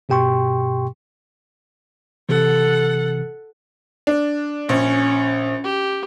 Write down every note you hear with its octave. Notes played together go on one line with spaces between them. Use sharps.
G2 B2 G4 G5 C6 C#6
C3 E3 A4 F#5
D4
A#1 C#4
G4